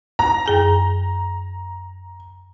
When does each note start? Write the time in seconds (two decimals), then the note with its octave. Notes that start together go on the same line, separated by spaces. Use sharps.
0.19 A#5
0.46 F#2 G#4 G#5